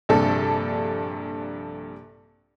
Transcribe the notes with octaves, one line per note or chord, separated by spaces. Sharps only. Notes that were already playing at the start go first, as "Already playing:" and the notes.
A#1 G2 C3 A4